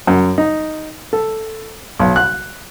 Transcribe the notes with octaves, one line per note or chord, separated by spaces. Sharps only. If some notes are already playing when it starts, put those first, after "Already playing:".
F#2
D#4
A4
B1
F#6